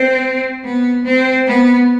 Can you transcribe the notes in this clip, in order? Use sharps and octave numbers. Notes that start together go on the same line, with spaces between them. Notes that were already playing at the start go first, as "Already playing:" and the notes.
Already playing: C4
B3
C4
B3